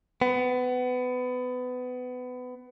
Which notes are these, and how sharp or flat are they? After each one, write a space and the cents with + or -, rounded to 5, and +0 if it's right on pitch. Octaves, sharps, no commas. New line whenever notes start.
B3 +25